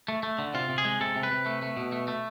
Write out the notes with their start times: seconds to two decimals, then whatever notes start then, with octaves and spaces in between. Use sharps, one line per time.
0.08 A3
0.23 A3
0.39 D3
0.54 C3 F4
0.69 C3
0.78 G#4
0.85 G#3
1.00 C3 A4
1.16 C3
1.23 B4
1.31 C3
1.46 A3
1.62 A3
1.77 B2
1.92 A3
2.08 A3